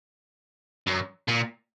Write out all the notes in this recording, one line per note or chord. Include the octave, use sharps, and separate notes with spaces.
F#2
A#2